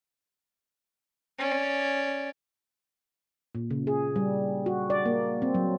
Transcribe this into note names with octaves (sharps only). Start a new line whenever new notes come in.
C#4 D5
A#2
C#3
G#4
G3
F#4
D5
A#3
C4
F#3